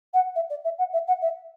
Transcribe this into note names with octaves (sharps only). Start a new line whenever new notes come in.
F#5
E5
D5
E5
F#5
E5
F#5
E5